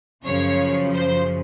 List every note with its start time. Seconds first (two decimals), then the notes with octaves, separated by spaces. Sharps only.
0.25 F#2 C#3 F3 C#5
0.94 C5